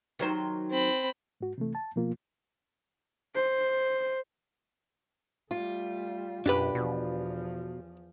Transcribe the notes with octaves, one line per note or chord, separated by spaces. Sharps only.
D#3 F#3 C5
C4 B5
G#2 F#4
C3 E3 A3
A5
B2 F3 A#3 F4
C5
G3 A3 F4
F#2 B2 D4 G4 B4
E2 B2 F3